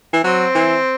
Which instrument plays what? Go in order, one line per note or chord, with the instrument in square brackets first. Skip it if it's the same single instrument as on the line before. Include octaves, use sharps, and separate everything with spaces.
[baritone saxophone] E3
[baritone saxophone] F#3 [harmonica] C4
[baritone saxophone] E3